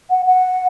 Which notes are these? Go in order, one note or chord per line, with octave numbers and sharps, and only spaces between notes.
F#5
F#5